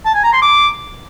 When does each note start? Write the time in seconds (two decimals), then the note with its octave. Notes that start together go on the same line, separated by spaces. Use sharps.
0.05 A5
0.14 G#5
0.24 A#5
0.33 C6
0.42 D6